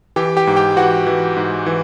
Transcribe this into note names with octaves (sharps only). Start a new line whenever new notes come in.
E3 G4 G5
G4 G5
G#2
G4 G5
E3 F#4 F#5
E3
G#2
E3